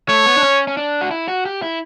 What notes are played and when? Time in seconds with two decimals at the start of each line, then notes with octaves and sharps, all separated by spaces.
0.09 A3 C#5
0.26 B3
0.37 D4
0.43 C#4
0.68 C#4
0.77 D4
1.01 F#4
1.11 E4
1.28 F#4
1.45 G4
1.62 E4